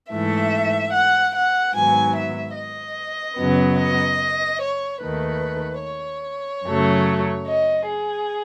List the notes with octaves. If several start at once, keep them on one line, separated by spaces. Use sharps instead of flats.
G#2 E3 A3 E5
F#5
F#5
G#2 D#3 F#3 B3 G#5
E5
D#5
F#2 C#3 F#3 B3
D#5
C#5
D#2 D#3 A3 B4
C#5
F#2 C#3 F#3 A3
D#5
G#4